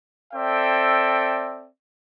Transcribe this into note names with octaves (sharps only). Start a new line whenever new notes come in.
C4 A4 D5 E5 G5